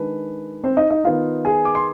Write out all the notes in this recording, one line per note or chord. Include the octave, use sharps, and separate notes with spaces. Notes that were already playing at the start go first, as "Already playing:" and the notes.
Already playing: D#3 G#3 D4 B4
C4 C5
D#4 D#5
D#4 D#5
D#3 B3 D#4 F4 F5
G#4 G#5
D6
C6